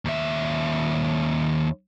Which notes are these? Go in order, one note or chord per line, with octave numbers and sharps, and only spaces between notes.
D#2 E5